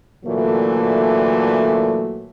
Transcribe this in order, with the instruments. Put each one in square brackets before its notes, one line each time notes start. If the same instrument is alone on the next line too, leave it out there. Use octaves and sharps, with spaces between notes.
[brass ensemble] A#2 D3 E3 F#3 A3